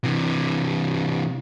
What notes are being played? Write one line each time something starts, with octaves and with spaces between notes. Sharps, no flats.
C3 E3